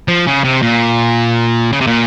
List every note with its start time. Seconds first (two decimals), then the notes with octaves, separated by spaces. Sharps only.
0.08 F3
0.27 C#3
0.44 C3
0.62 A#2
1.72 C#3
1.81 C3
1.87 A#2